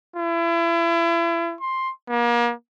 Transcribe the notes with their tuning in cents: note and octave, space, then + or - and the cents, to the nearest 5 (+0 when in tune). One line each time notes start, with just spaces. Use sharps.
E4 +35
C6 +10
A#3 +35